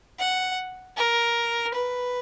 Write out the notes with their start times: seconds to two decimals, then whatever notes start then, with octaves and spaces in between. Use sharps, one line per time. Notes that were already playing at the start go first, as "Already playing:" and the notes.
0.19 F#5
0.96 A#4
1.74 B4